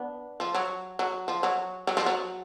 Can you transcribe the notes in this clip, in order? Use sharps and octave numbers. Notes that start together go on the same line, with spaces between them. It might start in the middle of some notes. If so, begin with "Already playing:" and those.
Already playing: B3 D4
F3
F#3
F#3
F3
F#3
F#3
F3
F#3